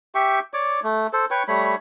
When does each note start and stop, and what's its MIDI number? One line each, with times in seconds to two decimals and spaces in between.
0.15 0.40 67
0.15 0.40 76
0.15 0.40 79
0.15 0.40 85
0.54 0.80 73
0.54 0.80 74
0.54 0.80 86
0.84 1.07 57
1.13 1.25 69
1.13 1.25 72
1.31 1.43 71
1.31 1.43 73
1.31 1.43 79
1.31 1.43 85
1.48 1.75 55
1.48 1.75 57
1.48 1.75 73
1.48 1.75 83